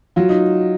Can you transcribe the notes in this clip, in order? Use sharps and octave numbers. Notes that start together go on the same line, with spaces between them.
F#3 F4
D#4